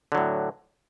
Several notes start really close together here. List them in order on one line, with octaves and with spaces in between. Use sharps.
D3 F#3 A2